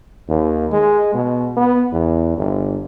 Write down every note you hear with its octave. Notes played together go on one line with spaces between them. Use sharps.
D#2
G#3
B2
B3
E2
G1